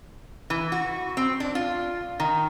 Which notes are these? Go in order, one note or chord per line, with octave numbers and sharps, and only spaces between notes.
E3
F#4
C4
D4
F4
D#3